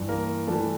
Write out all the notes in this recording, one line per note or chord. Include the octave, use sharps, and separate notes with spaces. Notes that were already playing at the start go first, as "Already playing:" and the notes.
Already playing: G2 E3
A#3 A#4
G2 E3 A3 A4